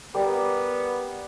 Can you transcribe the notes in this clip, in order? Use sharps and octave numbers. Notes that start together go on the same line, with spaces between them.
G3 B3 G4 A#4